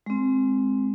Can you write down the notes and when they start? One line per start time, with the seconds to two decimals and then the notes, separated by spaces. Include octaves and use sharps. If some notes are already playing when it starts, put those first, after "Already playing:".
0.06 G#3 C4